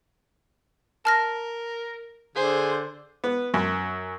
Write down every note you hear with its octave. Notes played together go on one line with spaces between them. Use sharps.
A#4 A5 F6 A#6
D3 G#4 C5
B3
F#2